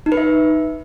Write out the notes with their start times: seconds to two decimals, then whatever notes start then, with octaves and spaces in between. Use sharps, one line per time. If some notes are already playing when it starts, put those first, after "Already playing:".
0.06 D#4
0.12 B4
0.17 E5